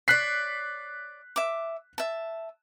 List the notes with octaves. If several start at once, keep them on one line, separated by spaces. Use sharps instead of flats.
C#5 D5 F#6 B6 C7
E5 D6
E5 A5